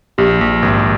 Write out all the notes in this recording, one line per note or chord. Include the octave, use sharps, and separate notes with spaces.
A#1 G4
A#1
G#1